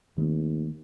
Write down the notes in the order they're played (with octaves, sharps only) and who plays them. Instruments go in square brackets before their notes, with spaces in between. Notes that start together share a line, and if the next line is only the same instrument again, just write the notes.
[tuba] D#2 [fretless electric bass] D#3 A3 C4